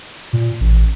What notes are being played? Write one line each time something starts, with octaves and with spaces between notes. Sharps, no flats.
A#2
A1